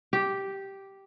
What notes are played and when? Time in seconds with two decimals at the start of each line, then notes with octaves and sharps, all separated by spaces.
0.13 G4